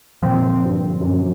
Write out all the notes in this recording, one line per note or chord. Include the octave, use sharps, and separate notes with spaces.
A#2 D3 F3 C4
G2
F#2